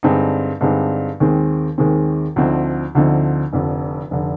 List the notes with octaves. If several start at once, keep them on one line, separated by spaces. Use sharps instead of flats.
G2 D3 G#3 C4 D#4
G2 D3 G#3 C4 D#4
D#2 D#3 G#3 C4
D#2 D#3 G#3 C4
D2 D3 F3 C4 D#4
D2 D3 F3 C4 D#4
F1 F2 D3
F1 D3